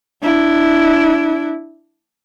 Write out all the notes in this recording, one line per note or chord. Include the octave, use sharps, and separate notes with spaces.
D4 E4